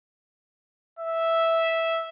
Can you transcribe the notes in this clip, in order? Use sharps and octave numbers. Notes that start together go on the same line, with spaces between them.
E5